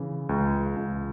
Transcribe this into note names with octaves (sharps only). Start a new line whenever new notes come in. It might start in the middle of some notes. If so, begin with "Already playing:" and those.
Already playing: C#3 E3
C#2
C#2